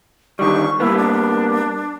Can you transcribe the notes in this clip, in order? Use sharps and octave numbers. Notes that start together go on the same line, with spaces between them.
D3 D#3 G3 C#6
G3 A#3 B3 E4
D4